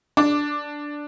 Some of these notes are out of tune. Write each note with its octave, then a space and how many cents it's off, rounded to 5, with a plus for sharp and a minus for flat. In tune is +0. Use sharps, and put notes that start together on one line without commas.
D4 +0 D6 +0